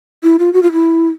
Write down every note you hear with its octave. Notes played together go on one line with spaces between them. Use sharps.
E4
F4
F#4
F4
E4